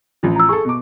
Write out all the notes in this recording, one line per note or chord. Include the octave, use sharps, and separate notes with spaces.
A1 F3
A#5 E6
G#4 A4 C#6
B2 D6